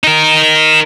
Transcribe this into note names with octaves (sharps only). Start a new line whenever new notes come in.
D#4 A#4